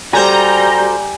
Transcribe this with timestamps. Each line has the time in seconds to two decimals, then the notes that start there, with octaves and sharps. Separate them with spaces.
0.13 G3 F#4 A4 C5 G#5 A#5 G6